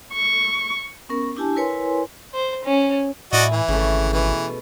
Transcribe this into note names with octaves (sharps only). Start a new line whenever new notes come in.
C#6
B3 C#4 A#4
D4 E4 G4 G#5 A5
E4 A#4 B4 C#5 G#5 C6
C5
C#4
A2 E4 F#4 D5 D#5 G#5
E3
G#1 C#3 A3
B2 E3